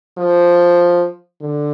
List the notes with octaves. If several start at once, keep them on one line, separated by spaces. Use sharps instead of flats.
F3
D3